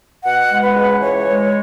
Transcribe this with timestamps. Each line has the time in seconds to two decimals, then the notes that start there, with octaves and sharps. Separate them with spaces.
0.25 B2 F#5
0.50 G#3
0.63 B4
0.75 C#2
1.00 E3 C#5
1.27 G#3